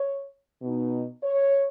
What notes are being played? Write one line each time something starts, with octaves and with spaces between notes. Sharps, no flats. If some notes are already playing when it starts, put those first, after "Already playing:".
Already playing: C#5
B2 B3 D#4
C#5